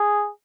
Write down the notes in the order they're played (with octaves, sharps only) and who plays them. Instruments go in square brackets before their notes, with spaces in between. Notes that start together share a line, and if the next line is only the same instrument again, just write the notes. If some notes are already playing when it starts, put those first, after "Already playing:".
Already playing: [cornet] G#4